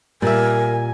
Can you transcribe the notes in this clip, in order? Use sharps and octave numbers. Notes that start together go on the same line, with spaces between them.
A#2 G3 A#4 E5 G#5